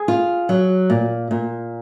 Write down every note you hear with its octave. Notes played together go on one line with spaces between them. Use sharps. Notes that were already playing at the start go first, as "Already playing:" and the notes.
Already playing: G#4
F4
F#3
A#2
A#2